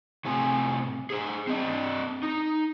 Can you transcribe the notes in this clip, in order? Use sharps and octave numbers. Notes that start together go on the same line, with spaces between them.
A2 C3 C4 G#5
G#4 C5
C4 D4 D#5
D#4